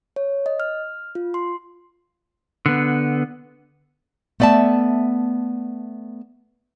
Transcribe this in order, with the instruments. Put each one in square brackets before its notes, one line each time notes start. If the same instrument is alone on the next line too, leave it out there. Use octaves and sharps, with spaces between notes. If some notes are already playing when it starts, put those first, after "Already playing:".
[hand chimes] C#5
D#5
F6
F4
C6
[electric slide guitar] D3 B3
[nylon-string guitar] A3 B3 D5 E5 A5